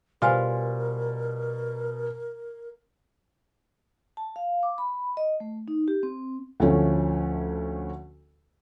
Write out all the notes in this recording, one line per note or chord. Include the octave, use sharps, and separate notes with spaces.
B2 G3 F4 A#4 C5 F5 G#5 C6
A5
F5
D6
B5
D#5
A3
D#4
G4
C4
D2 F3 A3 C#4